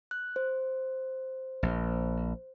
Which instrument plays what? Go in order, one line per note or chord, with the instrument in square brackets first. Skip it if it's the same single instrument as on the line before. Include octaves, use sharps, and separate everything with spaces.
[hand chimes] F#6
C5
[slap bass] A#1